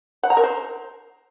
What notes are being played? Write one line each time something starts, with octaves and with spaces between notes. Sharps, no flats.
F#5
A#5
A#4
C5